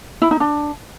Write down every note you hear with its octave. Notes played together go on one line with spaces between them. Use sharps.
E4
D#4
D4